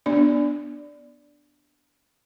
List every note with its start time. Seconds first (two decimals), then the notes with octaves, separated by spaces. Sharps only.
0.06 B3 D4 D5